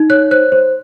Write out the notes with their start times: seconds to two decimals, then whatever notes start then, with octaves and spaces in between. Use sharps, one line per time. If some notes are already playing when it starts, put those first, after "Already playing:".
Already playing: D#4
0.10 C#5 F#6
0.31 C5 F#6
0.52 C5